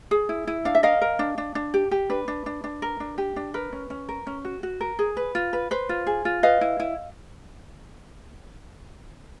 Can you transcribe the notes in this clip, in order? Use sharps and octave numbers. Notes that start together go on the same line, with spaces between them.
G#4
E4
E4
D4 F5
E5
A#4 D#5 F5
A#4
D4
D4
D4
G4
G4
D4 B4
D4
D4
D4
A#4
D4
G4
D4
A#4 B4
C#4
C#4
A#4
C#4
F#4
F#4
A#4
G#4
B4
F4
B4
B4 C5
F4
G#4
F4
B4 D#5 F5
E4
E4